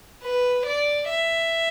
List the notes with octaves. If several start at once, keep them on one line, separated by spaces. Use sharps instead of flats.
B4
D5
E5